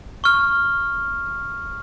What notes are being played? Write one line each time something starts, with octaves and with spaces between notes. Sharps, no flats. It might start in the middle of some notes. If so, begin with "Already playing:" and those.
C#6 F6